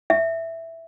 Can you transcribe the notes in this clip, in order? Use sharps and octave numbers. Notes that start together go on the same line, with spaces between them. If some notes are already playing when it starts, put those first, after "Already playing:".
E5